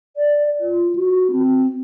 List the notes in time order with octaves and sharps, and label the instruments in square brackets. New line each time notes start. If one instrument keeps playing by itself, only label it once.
[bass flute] D5
F4
F#4
C4